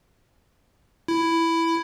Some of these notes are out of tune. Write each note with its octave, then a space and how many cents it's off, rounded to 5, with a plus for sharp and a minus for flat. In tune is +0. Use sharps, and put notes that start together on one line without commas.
E4 +5